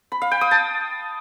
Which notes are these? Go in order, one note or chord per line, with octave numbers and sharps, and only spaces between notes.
B5
F5
G5
D#6
A5